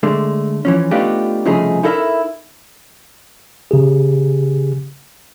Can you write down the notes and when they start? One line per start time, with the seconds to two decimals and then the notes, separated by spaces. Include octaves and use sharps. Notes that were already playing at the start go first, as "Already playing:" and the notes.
0.03 D3 G#3 A3
0.65 E3 F3 C#4
0.91 A3 B3 D4 D#4 F4 G4
1.45 C2 C#3 F3 A3 D#4 G#4
1.83 D#4 E4 A4 A#4 D5 E5
3.71 C#3 G4 G#4